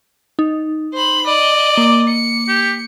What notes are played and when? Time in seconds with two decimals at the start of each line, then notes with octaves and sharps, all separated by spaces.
0.39 D#4
0.93 C5 B5
1.27 D5 D#5
1.77 A#3 D6
2.09 C#7
2.49 G4